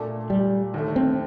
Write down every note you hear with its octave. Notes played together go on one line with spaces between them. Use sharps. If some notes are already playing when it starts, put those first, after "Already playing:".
Already playing: A#2 A3 D4 A4
G3
D#2 D3 A3
C4